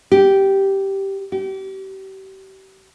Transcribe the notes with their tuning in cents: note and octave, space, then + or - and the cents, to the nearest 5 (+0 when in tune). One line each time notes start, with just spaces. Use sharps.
G4 -10
G4 -35